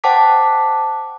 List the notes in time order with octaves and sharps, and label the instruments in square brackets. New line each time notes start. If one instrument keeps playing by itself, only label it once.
[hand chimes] C5 F#5 G5 A5 D6 B6